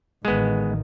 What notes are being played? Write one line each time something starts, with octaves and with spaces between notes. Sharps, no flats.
A1 D#3 G#3 B3